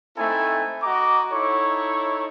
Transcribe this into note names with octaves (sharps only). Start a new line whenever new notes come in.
A3 C4 D#4 E4 A4 G#5
F#4 D#5 A#5 D6
D#4 E4 A4 C#5 C#6